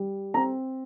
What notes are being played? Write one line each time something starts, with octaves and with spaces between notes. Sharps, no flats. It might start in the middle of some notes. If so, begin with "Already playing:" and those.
Already playing: G3
C4 A#5